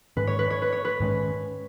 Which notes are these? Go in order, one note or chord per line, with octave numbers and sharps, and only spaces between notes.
G#2 D#3 G#3 C#4 B4
C#5
B4
C#5
B4
C#5
B4
G#2 D#3 G#3 C#4